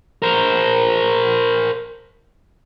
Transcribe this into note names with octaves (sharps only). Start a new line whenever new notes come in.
A#4 C5